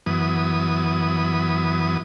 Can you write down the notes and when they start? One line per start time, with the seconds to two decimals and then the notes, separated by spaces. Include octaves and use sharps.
0.06 F#2 E3 B3 D#6